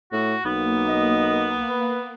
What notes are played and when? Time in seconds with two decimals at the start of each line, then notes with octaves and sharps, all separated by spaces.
0.13 A2 F#4
0.45 B1 A#3 B3
0.89 D#5
1.69 B4